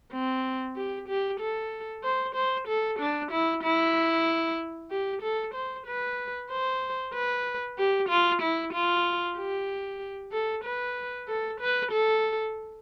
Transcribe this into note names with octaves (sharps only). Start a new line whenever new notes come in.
C4
G4
G4
A4
C5
C5
A4
D4
E4
E4
G4
A4
C5
B4
C5
B4
G4
F4
E4
F4
G4
A4
B4
A4
B4
A4